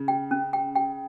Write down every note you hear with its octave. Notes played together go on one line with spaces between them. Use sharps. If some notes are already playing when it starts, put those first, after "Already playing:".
Already playing: C#3
G5
C#4
G5
G5